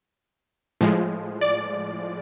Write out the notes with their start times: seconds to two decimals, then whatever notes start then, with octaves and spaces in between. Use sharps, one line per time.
0.81 A2 F3 G#3
1.41 D5